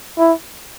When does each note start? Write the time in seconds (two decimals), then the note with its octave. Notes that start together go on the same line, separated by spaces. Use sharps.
0.18 E4